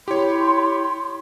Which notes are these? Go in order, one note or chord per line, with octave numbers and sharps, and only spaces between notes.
E4 G4 C#5 C6